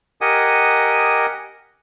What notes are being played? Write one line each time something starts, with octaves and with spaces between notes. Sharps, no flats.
G4 A#4 D#5 F#5 G#5 D#6